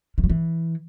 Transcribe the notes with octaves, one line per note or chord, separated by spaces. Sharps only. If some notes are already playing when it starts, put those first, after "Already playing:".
D#3
F#3
E3